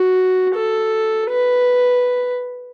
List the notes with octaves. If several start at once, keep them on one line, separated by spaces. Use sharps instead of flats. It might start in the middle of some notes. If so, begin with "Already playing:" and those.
Already playing: F#4
A4
B4